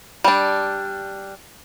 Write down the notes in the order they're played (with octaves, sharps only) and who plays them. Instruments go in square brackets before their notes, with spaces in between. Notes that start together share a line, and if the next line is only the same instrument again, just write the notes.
[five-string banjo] G3 D4